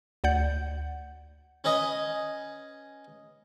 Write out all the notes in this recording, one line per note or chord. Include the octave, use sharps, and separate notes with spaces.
D2 D5 F#5 G6
C#4 B4 D#5 G#5